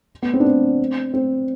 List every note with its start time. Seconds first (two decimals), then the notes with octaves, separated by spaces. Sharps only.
0.22 B3
0.34 C4
0.40 D4
0.45 C4
1.14 C4